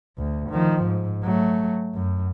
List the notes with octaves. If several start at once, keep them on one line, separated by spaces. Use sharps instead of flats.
D2
D#3 F3
G#2
F#3 A3
F#2